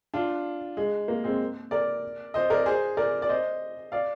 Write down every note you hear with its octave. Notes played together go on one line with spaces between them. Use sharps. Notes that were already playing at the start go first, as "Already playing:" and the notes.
D4 F4
G#3
A#3
G#3 C4
A#4 D5
C5 D#5
A#4 D5
G#4 C5
A#4 D5
D5
C5 D#5
D5 F5